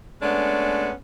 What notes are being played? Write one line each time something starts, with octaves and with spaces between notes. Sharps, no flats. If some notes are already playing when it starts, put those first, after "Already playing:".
G#3 A3 B3 C#4 D4